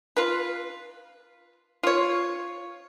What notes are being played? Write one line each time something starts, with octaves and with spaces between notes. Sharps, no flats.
F4 B4
F4 C#5